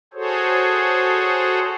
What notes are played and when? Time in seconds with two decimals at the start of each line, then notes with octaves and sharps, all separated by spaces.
0.13 F#4 G#4 A4 C5 C#5